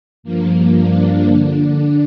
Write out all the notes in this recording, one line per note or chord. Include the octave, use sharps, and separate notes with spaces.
G2 F3 A#3
D4
D3 D4